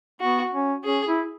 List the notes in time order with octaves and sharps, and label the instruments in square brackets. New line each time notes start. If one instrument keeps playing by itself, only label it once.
[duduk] B3 [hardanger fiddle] F#4
[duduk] C#4
[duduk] C#4 [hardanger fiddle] G#4
[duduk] E4